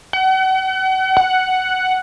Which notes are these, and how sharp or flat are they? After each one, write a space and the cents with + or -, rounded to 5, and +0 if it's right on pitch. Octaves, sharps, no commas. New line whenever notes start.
F#5 +40
F#5 +5